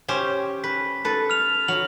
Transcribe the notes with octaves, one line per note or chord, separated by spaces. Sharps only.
C#4 G4 C5
B4 B6
A4 B4
F6 F7
F#3 F#7